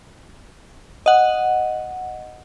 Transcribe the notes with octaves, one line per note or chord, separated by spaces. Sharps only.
D#5 F#5